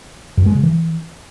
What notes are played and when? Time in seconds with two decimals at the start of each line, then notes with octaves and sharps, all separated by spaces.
0.37 F#2
0.46 G#3
0.55 C#3
0.63 E3